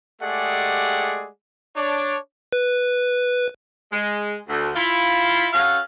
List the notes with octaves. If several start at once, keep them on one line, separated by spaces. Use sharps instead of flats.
G#3 A3 G4 G#4 D5 F#5
D4 C#5 D6
B4
G#3
D2
E4 F4
C#4 F#4 A4 F5